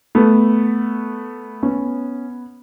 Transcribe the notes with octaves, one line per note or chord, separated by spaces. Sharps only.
A3 B3
B3 C#4